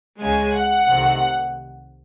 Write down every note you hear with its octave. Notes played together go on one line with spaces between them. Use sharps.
C#2 C#3 G#3 G#5
F#5
C2 C3 D#3 A3 C4